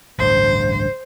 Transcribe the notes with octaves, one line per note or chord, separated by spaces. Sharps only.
A1 D2 G2 C5